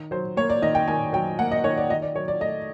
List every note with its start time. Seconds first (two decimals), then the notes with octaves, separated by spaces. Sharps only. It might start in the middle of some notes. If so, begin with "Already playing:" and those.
Already playing: D#3
0.11 F#3 C5
0.37 A#3 C#5
0.50 D5
0.62 D#3 D#5
0.75 G5
0.88 D#3 G#5
1.13 F#3 G5
1.39 A#3 F#5
1.51 D#5
1.64 D#3 C#5
1.78 D5
1.90 D#3 D#5
2.02 D5
2.15 F#3 C#5
2.28 D5
2.40 A3 D#5